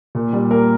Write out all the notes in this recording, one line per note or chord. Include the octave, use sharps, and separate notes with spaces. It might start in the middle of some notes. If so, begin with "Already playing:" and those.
A#2
G3
A#3 A#4